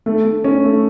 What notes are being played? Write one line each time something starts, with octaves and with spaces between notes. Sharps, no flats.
A3
A3
C#4
A3